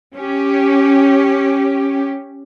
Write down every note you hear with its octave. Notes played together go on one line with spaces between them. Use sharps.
C#4 G4